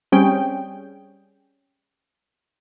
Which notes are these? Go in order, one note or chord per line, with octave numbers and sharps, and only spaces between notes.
G3 C4 C#4 G#4 G5